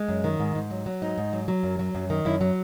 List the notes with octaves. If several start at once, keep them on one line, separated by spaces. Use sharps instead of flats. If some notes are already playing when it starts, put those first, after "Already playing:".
Already playing: G#3
F#2
D#3
G#2
G#2
F#3
F#3
G#2 D#4
G#2
F#3
F#3
F#2
F#3
F#2
D#3
F#2 E4
F#3